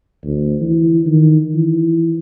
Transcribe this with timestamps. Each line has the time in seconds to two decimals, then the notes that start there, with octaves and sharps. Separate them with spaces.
0.24 D2
0.62 E3
1.07 D#3
1.54 E3